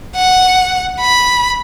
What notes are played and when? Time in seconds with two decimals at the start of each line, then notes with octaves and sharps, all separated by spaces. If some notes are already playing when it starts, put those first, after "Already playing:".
0.15 F#5
1.00 B5